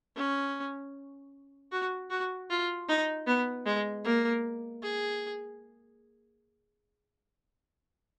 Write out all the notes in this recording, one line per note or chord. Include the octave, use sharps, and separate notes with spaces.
C#4
F#4
F#4
F4
D#4
B3
G#3
A#3
G#4